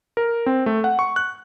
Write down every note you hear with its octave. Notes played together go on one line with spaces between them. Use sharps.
A#4
C4
A3
F#5
C#6
F#6